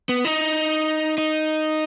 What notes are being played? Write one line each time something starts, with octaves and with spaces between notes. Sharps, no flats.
B3
D#4
D#4